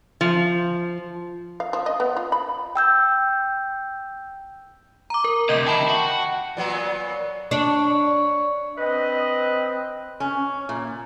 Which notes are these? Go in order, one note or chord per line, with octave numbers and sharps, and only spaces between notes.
F3
F5
F3
D#5
B3
F4
B5
G5 E6 G6
A#5 D6
A#4
D2 C3 D#5 G6
D#3 E4 G5 A5 B5
F#4
A#2 F#3 B3
D4 C#5
C4 B4 D#5
C#4
A#2